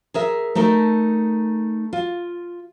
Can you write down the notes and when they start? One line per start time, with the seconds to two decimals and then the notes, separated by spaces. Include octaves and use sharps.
0.14 G#4 A#4 E5
0.55 A3 D#4 A4 A#4
1.93 F4